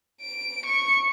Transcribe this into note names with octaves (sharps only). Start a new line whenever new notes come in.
D7
C#6